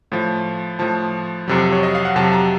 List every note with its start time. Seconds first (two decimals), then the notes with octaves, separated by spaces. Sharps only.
0.12 A2 F3
0.79 A2 F3 A5
1.48 F2 C3 F#3
1.72 C#5
1.83 D#5
1.95 F5
2.05 F#5
2.15 F2 C3 F#3 A5
2.33 A#5